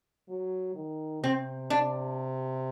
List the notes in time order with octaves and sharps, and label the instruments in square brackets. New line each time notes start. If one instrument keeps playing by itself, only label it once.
[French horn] F#3
D#3
[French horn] C3 [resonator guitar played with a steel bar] C4
[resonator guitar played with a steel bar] D4